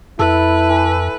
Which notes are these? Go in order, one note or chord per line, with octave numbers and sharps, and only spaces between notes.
F2 E4 A4 B4
E3